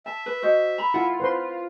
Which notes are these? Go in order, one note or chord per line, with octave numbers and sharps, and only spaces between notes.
E5 A5
B4
F#4 C5 D#5
A#5 B5
E4 F4 F#5
B4 C5 C6